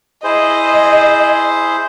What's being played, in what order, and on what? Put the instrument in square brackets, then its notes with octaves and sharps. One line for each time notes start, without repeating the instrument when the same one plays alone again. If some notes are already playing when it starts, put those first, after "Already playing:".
[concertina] E4 G#4 C5 [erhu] D#5